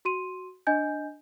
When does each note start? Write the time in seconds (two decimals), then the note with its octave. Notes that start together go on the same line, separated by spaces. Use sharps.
0.05 F#4 C6 D#7
0.67 D4 D#5 G#5 G6